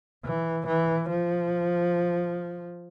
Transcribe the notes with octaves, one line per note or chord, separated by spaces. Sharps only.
E3
E3
F3